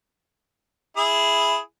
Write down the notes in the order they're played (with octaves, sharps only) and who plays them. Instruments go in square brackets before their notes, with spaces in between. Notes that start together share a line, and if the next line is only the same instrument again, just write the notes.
[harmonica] E4 G#4